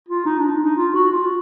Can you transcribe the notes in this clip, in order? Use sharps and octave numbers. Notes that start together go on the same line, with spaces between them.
F4
D#4
D4
D#4
D#4
F4
F#4
F4